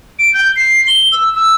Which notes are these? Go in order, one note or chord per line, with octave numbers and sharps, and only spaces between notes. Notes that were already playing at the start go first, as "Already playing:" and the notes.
D7
G6
C7
G7
E6
E6